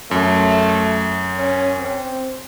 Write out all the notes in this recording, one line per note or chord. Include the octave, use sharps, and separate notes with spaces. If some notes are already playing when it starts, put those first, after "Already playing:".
F#2 A3
C#4
C4